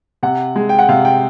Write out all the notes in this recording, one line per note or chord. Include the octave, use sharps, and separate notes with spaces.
C3 F#5
G#3
G5
F#5
C3 F5
G5